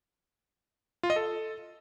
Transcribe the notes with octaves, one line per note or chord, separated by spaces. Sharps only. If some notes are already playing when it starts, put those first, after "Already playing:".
F4
D#5
A4